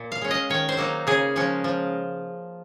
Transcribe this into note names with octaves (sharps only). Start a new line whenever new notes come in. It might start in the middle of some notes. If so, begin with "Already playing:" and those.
Already playing: A#2
F5
G#3 C#4
D#5
D#3 C#5
C5
F#3 A#3 D#4
C#3 G#4
F3 G#3 C#4
F3